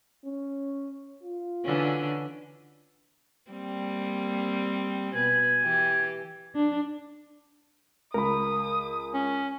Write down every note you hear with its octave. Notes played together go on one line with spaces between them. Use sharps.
C#4
F4
D3 E3 C#4
G3 A#3 C4
B2 B4 G#5
E3 G4
D4
C#2 A#4 B5 D#6
C#4